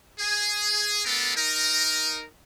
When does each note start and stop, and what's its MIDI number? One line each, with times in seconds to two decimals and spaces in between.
0.19 1.01 68
1.05 1.36 57
1.05 1.36 59
1.05 1.36 62
1.05 1.36 69
1.05 1.36 70
1.36 2.25 63
1.36 2.25 70